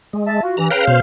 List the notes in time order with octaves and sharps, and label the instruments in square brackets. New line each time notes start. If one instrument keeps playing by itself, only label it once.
[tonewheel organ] G#3
[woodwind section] E5 A5
F4 F#4
[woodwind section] G2 E3 [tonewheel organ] A#5
[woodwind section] C#3 F5 [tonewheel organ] B4 G5 A#5
[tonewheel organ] B2 C5 F6